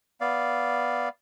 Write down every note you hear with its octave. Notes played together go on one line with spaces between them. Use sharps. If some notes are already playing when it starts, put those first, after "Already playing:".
B3 D5 F5